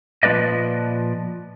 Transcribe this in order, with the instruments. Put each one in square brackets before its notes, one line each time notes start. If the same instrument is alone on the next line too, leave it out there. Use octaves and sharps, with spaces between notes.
[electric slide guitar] A#2 F3 B3 B4 D5 D#5